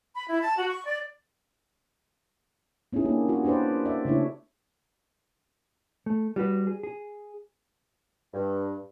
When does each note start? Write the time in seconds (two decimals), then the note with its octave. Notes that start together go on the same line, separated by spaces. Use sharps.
0.14 B5
0.29 E4
0.41 A5
0.56 F#4
0.69 C#6
0.84 D5
2.93 B3 C#4 D#4 E4 G#4
3.05 A#3 D4 G4 G#4
3.28 F4 F#4 G#4
3.45 D4 G4 B4 C5 D5
3.86 D5 E5
4.05 C#3 A3 D4 E4 C#5
6.06 A3
6.36 G3 F#4 B4
6.67 G#4
6.83 G#4
8.34 G2